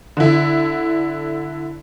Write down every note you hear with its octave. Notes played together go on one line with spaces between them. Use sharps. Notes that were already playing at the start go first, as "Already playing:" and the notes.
D3 E4